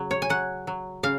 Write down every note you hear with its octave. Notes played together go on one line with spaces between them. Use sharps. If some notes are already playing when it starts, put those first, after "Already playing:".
Already playing: C#3 F#3
C#5
G#5
F#3 F#5
F#3
C#3 F5